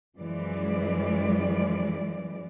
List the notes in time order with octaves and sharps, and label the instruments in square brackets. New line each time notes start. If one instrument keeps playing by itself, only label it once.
[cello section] F#2 E3 F3 G#3 D5